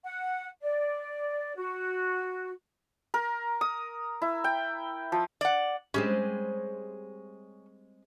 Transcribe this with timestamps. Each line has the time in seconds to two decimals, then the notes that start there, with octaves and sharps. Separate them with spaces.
0.05 F#5
0.62 D5
1.56 F#4
3.14 A#4
3.61 D#6
4.22 E4
4.44 G5
5.12 F3
5.41 D5 F#5
5.94 G3 G#3 C4 C#4